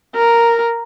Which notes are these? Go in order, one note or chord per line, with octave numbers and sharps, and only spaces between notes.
A#4